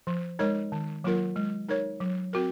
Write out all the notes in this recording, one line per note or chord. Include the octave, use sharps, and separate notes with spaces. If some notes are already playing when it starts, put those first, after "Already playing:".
F3
G#3 D#4 A#4 C#5
D#3
F#3 A#3 F4 A#4
G#3
D#4 A#4 C#5
F#3
C4 F#4 A#4